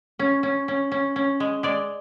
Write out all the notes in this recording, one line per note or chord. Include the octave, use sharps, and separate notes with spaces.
C#4
C#4
C#4
C#4
C#4
G#3
G#3 D5